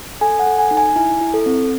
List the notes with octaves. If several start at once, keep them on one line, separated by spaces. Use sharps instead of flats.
A4 G#5
F#5
A4
G#5
D#4
G#5
E4 G#5
E4
A4
C4